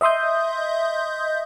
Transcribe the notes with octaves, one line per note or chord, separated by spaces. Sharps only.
D#5 E5 C6 D#6 G6